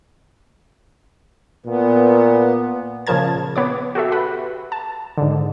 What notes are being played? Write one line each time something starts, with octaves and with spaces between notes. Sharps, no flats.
A#2 B3
A#2 C#3 F3 A#4 A5 G#6
B3 C#5 D6
F#4 G4 A4 E5
B4 F#5 B5
A5
G#2 D3